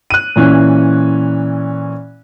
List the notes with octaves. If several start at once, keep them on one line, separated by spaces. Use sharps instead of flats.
F#6 D#7
A#2 E3 C#4